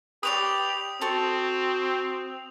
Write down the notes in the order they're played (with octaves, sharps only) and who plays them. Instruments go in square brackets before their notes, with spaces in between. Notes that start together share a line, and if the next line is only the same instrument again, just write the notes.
[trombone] G4 [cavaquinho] B4 C#5 D5 [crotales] D#6 F7
[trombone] C4 [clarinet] F#4 [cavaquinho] A4 C5 C#6